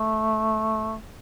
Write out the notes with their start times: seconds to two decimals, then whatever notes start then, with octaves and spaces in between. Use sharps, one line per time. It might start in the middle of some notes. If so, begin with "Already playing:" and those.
Already playing: A3